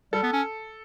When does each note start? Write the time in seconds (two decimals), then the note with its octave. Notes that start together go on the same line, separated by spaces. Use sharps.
0.13 G3 A4
0.23 B3
0.33 C#4